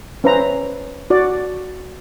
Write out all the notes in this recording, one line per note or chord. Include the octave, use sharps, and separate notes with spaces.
C#4 B4 C5 E5 A#5
F#4 D5